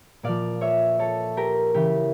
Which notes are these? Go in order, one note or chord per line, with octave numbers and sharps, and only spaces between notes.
A#2 F3 D5 F5
C#5 E5
A4 C#5
G4 A#4
C#3 E3 G4